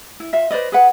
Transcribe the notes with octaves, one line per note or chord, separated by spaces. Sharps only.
E4
F4 E5
B4 C5 D5 D#5
G#4 B4 F#5